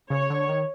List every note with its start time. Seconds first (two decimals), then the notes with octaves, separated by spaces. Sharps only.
0.10 C#3 C#5
0.30 D3
0.49 D#3